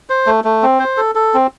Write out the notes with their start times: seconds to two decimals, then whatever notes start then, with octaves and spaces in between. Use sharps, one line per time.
0.10 C5
0.26 A3
0.44 A3
0.63 C4
0.80 C5
0.97 A4
1.15 A4
1.34 C4